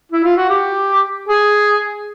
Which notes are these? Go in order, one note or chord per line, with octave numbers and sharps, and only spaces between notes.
E4
F4
F#4
G4
G#4